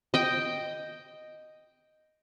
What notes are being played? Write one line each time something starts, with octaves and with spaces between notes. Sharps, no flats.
D#5 G5